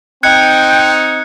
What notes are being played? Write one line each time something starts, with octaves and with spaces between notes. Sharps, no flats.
C4 D#4 G5 F#6 G#6 C#7